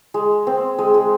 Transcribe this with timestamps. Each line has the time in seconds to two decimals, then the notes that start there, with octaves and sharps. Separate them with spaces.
0.14 G#3
0.47 C4
0.79 G#3
0.94 G#3